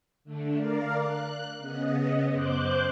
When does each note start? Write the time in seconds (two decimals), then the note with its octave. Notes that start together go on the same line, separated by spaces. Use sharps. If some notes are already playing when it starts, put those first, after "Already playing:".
0.24 D3 A3 D4
0.55 A#4 D5 F5
0.97 F#6
1.58 C#3 B3 D#5
2.31 F#2 C5 D6 F#6 G6